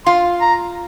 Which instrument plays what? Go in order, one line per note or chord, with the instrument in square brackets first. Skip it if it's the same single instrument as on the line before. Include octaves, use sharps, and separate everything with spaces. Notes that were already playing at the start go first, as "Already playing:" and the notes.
[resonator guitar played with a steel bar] F4 [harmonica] C6
[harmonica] A#5